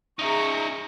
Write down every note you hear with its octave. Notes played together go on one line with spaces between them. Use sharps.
D#4 G#4 E5 A#5 C#6